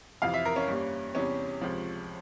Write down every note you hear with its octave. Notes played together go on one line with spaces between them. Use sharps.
F2 C3 E3 F5
E5
A#4
C#4
G2 G3 A#3
E2 C3 G3 C#4
C#2 C3 F3